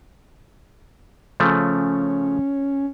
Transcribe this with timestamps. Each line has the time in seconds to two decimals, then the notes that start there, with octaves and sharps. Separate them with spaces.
1.40 C#3 F3 A3 C#4